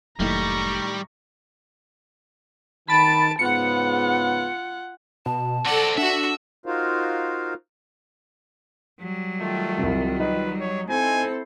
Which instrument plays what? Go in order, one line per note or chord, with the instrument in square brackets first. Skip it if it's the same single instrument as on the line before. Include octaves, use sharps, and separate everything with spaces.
[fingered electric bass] F1 F#3 A#3 [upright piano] A2 D#3 [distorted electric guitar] G3 [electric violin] A#5 C#6
[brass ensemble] D#3 [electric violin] A5 D7 [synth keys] B5 A6
[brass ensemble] G#2 C#3 B3 [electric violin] F4 F#5 [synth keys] C#7
[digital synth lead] B2 [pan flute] A5
[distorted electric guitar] C4 D5 [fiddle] A4 F#5 [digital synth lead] A#6
[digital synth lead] D4 [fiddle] F#4 F#5 [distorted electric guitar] E5
[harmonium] D#4 F4 F#4 A#4 C5 F5
[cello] F#3 G3
[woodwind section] D#3 F4 [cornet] A3
[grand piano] C2 C3
[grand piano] D#4 [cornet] B4
[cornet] C#5
[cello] C4 A4 [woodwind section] E4 C5 [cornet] G#5